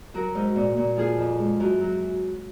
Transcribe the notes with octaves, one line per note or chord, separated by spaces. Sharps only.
F#3 F#4 A#4
G#2
A#2
A#2
F3 F4 G#4
F2
G#3
F#2
F#3